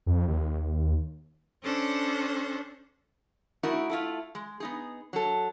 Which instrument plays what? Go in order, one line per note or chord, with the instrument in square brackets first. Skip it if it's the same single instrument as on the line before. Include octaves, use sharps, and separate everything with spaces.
[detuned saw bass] F2
D#2
[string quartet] C#4 D4 A4 C5
[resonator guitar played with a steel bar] A3 D#4 E4 F#4 A#4
A3 E4 F4
G#3
B3 D#4 G#4
F#3 A4